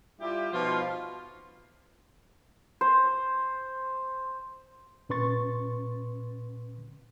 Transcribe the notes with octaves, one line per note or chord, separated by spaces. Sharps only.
G3 E4 F4 G4
B2 F3 D#4 F4
C5
A#2 C#4 B4 C6 C#6 A6